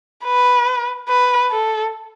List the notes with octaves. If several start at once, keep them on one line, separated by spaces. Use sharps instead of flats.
B4
B4
A4